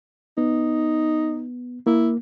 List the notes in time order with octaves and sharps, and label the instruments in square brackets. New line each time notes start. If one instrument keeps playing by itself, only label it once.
[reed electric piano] B3 [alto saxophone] D#4
[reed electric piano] A#3 [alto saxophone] E4